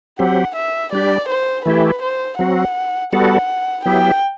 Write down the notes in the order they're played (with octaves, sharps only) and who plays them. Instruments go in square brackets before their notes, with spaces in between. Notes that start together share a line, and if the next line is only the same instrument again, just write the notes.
[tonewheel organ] F#3 C4 G4 [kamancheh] F#5
[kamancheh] E5
[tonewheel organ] G3 D4 G4 [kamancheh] D5
[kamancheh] C5
[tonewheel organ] E3 A3 E4 G4 [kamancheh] B4
[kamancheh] C5
[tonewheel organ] F#3 C4 F#4 [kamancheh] F#5
[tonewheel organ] G3 B3 F#4 A4 [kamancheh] F#5
[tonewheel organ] F#3 B3 E4 G4 [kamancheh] G5